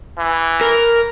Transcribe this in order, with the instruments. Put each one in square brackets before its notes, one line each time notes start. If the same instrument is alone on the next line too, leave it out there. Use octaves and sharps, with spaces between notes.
[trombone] E3
[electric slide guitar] A#4